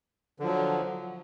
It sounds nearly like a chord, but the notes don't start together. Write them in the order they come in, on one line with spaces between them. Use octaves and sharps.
D3 F3 F#3